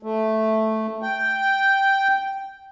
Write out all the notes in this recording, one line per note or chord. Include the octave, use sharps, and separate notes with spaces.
A3
G5